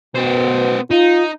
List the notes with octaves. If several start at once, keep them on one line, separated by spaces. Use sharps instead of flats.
B2 B3 C5
D#4 F4